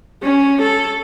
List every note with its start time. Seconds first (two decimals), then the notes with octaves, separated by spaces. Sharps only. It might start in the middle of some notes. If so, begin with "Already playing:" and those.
0.23 C#4
0.62 A4